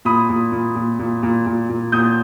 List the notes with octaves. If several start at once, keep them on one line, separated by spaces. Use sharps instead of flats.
A#2 B5 D#6
A#2
A#2
A#2
A#2
A#2
A#2
A#2
A#2 D#6 G6